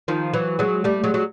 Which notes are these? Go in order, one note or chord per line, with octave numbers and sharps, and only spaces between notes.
D#3 F3
E3 F#3
F#3 G#3
G3 A3
F#3 G#3
F#3